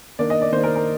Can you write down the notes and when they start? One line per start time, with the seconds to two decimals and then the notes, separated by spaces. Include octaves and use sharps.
0.19 D#3 A#3 D4 D5
0.30 D#5
0.42 D5
0.52 D#3 A#3 D4 C5
0.63 A#4
0.75 A#4